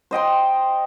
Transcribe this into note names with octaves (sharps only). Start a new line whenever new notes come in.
C5 D#5 G5 C6